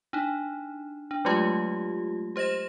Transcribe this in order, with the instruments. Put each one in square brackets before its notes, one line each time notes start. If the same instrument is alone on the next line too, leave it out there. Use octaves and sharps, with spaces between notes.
[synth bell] D4 D#4
D4
F#3 G#3 A3 F4 G4
G4 C5 D#5 A#6 E7